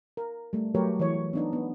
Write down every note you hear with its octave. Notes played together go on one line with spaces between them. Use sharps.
A#4
G3 A3
F#3 A3 G4 A#4 B4 C#5
E3 C#5
B3 D4 D#4
B3